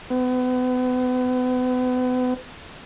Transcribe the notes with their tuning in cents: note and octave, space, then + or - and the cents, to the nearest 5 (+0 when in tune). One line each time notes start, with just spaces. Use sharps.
B3 +35